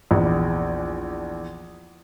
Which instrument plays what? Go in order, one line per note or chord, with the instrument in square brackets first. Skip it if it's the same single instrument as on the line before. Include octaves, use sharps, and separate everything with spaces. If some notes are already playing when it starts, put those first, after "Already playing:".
[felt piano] A#1 E2